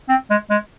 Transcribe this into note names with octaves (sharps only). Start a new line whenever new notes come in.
C4
G#3
G#3